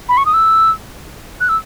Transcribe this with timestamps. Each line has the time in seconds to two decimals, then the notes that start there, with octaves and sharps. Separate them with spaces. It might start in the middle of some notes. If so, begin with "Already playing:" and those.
0.09 B5
0.17 C#6
0.26 D#6
0.34 E6
1.41 F#6
1.49 E6